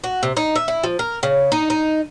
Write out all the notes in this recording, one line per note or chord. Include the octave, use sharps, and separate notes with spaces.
F#4
C3
D#4
E5
E4
F3
A#4
C#3
D#4
D#4